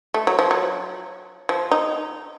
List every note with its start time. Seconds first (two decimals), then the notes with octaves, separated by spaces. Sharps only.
0.14 A3
0.27 F#3
0.39 F3
0.51 F#3
1.49 F3
1.71 D#4